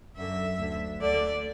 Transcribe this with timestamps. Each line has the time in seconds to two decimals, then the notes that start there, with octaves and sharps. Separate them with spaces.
0.16 F#2 D3 E5
0.58 D2 D3
1.00 D2 D3 D5